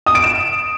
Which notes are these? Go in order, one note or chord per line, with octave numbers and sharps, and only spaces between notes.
D#6
D7
E7